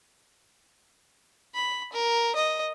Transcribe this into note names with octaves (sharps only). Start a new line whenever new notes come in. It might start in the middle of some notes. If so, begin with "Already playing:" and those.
B5
A#4
D#5